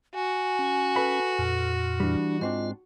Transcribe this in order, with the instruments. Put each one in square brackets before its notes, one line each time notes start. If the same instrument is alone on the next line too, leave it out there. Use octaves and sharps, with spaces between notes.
[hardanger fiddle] F#4 [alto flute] G#5
[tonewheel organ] C#4
[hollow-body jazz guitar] A4 B4 B5
[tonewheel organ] F2 A#2
[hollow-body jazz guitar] E3 G3 [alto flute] D4
[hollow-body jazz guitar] G#2 C4 D4 [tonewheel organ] F4 [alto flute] D#5